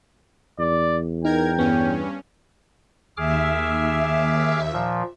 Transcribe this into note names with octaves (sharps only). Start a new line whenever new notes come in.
E2 D5
D#4 A#4 G5 G#6
G2 B3 C#4
D#2 G#4 E5 D6 F6
A#2 F3